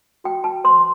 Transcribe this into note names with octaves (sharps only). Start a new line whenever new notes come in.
F#4 G5
A5
C5 C6